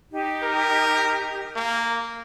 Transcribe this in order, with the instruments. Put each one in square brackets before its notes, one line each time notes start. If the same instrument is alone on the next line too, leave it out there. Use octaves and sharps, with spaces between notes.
[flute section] D#4 G4
[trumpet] A#4
A#3